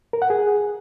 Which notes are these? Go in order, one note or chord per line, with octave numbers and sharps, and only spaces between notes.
A#4
F#5
G#4